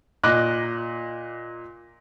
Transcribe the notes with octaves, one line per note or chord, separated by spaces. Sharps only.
A#2 D#5 D6 F#6